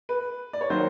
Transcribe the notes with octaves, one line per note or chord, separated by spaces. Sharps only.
B4
D5
C#5
D#3 F#3 A#3 C5